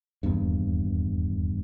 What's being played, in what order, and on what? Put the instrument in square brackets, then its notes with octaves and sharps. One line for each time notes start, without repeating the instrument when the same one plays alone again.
[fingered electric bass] D#1 E2 G2